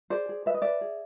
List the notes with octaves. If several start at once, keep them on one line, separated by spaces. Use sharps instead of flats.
G#4 C5 D5
G#4
B4 E5
D#5
B4 D5 E5
G#4